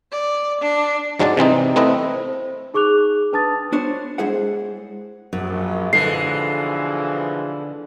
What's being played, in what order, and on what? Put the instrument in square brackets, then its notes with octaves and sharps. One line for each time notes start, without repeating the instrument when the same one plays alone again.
[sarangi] D5
D4
[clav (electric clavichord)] G#2 F#3 G#3 D4 D5 A5
C3 E3 C4 D#4
A3 C4 E4 B4 D#5
[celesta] C5
D#4 G#4 C#6 D6 F#6 F7
D4 B4 A5 D#6 A6
[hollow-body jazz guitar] B3 D4 C5 C#5
G#3 E4 G#4 C5 F#5
[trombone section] A#1 [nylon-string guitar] F#2
[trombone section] B1 E3 F3 [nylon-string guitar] D3 [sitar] G#3 A4 B4 [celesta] C7